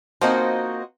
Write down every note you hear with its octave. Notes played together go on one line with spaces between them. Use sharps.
F3 A#3 C4 D#4 F4 F#4 C5 D#5